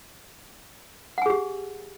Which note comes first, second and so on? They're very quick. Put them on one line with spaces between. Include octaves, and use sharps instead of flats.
F#5 G#5 G#4 G4